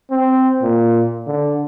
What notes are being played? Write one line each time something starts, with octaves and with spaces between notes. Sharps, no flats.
C4
A#2
D3